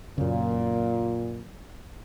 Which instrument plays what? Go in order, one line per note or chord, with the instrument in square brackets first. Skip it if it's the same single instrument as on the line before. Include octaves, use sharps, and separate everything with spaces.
[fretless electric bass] F#2 C#3 [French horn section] A#2